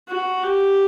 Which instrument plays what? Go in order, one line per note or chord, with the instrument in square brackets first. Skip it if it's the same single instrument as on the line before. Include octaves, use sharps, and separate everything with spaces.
[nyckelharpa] F#4
G4